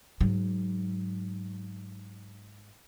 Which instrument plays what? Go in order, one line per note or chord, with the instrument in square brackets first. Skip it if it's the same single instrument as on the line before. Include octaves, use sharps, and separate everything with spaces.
[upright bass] G#2 F#3